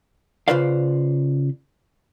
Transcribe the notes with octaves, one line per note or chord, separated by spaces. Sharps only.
C#3 F4 B4 C5 D5 F5